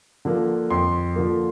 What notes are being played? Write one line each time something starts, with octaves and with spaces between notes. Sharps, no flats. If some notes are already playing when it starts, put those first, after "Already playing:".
D3 F3 A#3
F2 C6
D3 F3 A#3